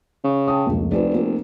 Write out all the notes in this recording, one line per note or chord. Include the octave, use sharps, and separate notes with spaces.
C#3
G5 A5 D#6
F1 C#2 A#3
F1 F4 B4 D5
A#3